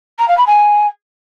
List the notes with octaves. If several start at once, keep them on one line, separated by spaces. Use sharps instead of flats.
A#5
F5
B5
G#5